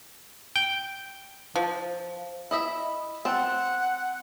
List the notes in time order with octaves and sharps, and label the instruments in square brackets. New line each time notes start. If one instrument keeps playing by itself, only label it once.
[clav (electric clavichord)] G5
[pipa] F3
[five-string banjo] E4 D#5 E5
[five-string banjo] C4 A5 [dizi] F#5